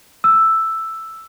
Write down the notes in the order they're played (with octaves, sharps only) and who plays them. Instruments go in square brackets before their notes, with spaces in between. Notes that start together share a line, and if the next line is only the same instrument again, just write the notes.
[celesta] E6